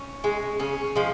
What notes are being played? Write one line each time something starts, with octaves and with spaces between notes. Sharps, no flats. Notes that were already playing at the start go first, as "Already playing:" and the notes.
Already playing: C#4
G#3
C#3 C#4
F3 G#3